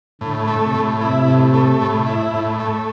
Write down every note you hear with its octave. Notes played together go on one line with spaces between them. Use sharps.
A2 D3
A3
C3
A2
C3 E4
A2
A3
A2
E4
A2
A3